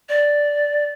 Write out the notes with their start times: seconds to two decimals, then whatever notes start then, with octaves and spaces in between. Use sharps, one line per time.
0.09 D5